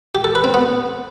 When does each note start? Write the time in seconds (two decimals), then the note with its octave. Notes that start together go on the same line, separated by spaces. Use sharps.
0.15 G4
0.24 A4
0.35 B4
0.44 C4
0.54 B3